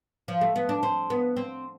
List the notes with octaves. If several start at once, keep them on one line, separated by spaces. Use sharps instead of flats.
F3
A3
B3
D4
C4
B3
C4